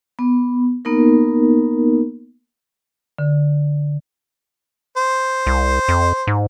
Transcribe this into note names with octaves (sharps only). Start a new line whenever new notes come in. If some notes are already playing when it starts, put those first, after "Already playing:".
B3
A#3 B3 D#4 A#4
D3
C5
C2
F2
G#2